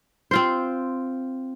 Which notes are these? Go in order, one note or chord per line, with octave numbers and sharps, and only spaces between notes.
C4 F4 C5